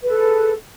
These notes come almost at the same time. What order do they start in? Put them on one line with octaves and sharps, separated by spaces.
B4 A4 G#4